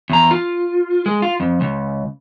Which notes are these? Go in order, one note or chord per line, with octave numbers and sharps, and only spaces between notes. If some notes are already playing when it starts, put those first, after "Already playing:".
E2 A#5
F4
G#3
F4
F2
C#2